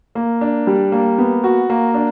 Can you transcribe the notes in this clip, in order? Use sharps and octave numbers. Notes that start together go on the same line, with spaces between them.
A#3
D4
G3
A#3
B3
F#4
A#3
D4